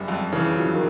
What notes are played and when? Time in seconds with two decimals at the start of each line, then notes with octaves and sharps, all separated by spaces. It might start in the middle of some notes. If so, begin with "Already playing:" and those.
Already playing: F#1 G3
0.08 F2
0.32 C#3 E3
0.56 F3 F#3
0.74 D#3